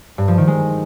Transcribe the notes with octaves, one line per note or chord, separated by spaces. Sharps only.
G2
F3
D#3
G#3